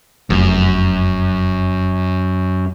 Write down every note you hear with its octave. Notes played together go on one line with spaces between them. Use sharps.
F1 F#2